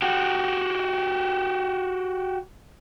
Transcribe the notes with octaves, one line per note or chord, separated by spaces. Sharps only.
F#4 G4